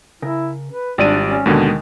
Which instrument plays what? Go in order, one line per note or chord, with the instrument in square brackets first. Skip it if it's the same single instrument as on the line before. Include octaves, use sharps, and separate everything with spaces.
[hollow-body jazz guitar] C#3 A#4 [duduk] E4
[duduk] B4
[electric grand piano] G#1 D5 D#7 [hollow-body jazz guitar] G3 F4 G4 [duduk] D4
[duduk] C#4
[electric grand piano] D#2 B2 D3 [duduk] D#3 [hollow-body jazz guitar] G#3 G#5